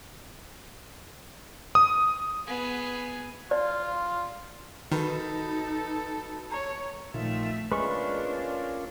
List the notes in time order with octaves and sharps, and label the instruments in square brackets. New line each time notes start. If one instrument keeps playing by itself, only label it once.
[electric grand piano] D#6
[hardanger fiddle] B3 G#4
[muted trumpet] F4 [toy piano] D5
[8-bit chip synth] D#3 [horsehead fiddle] D#4 [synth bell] F#4 B4 B5 [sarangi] A4
[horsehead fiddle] C#5 [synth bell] A#5
[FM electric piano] A#1 [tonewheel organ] D#3 F4 [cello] A3 E5
[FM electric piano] G#3 [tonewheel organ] A#3 C#4 F4 [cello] D4 [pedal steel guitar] B4 C#6